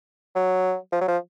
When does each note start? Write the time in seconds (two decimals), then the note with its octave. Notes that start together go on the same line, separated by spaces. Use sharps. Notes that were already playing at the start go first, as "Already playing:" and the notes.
0.35 F#3
0.92 F3
1.01 F#3
1.08 F3